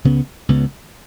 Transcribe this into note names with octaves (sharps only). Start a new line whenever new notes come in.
C#2 C#3 B3
C#2 C#3 B3